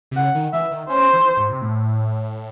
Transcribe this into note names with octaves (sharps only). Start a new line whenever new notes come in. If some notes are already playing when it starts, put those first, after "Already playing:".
C3
C#3 F#5
D#3
E3 E5
D#3
C#4 C5
E3
G#2
C3
A2